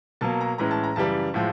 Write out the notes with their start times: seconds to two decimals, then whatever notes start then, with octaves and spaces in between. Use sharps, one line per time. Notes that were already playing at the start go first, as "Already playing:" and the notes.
0.21 B2 F#3 A#3 A5
0.41 A#5
0.58 A2 E3 G#3 C#4 A#5
0.71 A5
0.84 A#5
0.96 F#2 C#3 E3 G3 A5
1.34 A2 F3 G#3